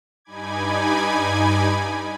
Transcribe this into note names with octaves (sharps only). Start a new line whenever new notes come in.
G2 D#4 G#5 B5 D6 G#6